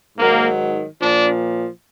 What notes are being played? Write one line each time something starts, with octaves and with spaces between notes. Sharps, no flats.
G#2 D#3 F#3 A#3
A#2 F3 D4